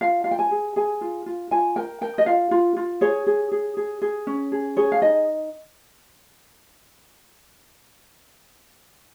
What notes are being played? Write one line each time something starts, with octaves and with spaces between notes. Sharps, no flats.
F4 F5
F4 F5
G5
G#5
G#4
G#4 G#5
F4
F4
F4 G#5
A#4 G5
A#4 G5
D#5
F4 F5
F4
F4
G#4 C#5
G#4
G#4
G#4
G#4
C#4
G#4
G#4 C#5
F5
D#4 D#5